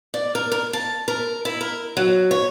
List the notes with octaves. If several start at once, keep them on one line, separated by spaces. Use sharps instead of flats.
D5
A#4
A#4
A5
A#4
E4
A#4
F#3
C#5